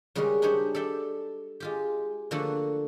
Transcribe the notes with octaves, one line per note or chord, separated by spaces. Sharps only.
C#3 G3 G#3 F#4 A#4
D4 D#4 G4 C5 C#5
A4 D5 E5 G5
G#3 F4 G4
D3 F3 A3 A#3 F#4 A4